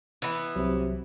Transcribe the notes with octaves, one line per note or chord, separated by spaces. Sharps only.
E3 B3
C2 C3 F#3